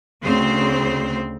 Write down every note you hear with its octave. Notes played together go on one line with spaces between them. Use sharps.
D2 C#3 C4 C5